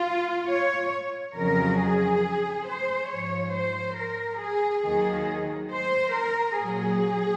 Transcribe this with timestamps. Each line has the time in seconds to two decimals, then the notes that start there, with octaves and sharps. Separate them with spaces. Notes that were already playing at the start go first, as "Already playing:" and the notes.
Already playing: F4
0.49 C#5
1.36 F2 C#3 F#3 A#4
1.80 G#4
2.67 C5
3.10 G#2 F3 C#5
3.54 C5
3.97 A#4
4.41 G#4
4.84 D#2 D#3 F#3 G#4
5.72 C5
6.14 A#4
6.58 A#2 F#3 G#4